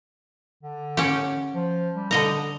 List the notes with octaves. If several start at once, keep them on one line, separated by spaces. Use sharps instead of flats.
D3
C#4 G4
F3
G3
D3 D#5 A#5